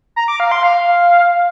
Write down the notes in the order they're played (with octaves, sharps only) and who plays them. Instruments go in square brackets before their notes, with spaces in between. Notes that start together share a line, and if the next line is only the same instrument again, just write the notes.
[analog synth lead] A#5
D6
F5
C6
F5